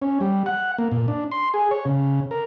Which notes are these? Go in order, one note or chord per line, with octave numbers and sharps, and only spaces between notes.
C#4
G3
F#5
A#3
A#2
D4
C6
G#4
C#5
C#3
A#4